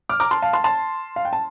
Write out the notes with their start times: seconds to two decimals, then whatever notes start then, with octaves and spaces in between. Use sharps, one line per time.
0.09 D6 F6
0.20 A#5 D6
0.31 A5 C6
0.42 F5 A5
0.53 A5 C6
0.64 A5 C6
1.16 F5
1.25 G5
1.33 A5